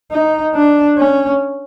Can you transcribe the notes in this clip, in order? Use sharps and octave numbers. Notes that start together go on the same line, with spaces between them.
D#4
D4
C#4